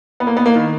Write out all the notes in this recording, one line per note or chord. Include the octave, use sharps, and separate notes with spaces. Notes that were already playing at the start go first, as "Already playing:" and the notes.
B3
A#3
B3
A#3
D#3